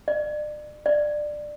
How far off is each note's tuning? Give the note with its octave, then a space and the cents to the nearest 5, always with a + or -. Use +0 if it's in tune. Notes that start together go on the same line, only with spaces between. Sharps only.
D5 +35
D5 +15